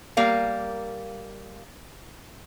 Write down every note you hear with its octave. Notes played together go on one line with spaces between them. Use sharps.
G3 A#3 A#4 F5